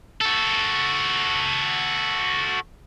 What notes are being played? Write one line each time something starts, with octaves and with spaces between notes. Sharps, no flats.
F#4 A4